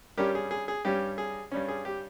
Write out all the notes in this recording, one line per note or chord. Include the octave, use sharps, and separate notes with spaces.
G2 G3 C#4 G4 A#4
G#4
G#4
G#4
G2 G3 C#4 G4
G#4
G2 G3 C#4
G#4
G4